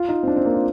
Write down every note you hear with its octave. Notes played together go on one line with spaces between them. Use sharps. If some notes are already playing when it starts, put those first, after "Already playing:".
Already playing: F4
D#4
C4
D4
C4
A#3
F4